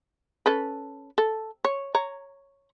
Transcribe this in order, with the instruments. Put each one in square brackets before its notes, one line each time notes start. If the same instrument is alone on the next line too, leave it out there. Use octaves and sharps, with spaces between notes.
[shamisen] C#4 A4 B4
A4
C#5
C#5 A#5